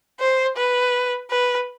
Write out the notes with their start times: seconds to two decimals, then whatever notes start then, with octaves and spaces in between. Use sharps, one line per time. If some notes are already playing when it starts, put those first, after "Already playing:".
0.20 C5
0.57 B4
1.30 B4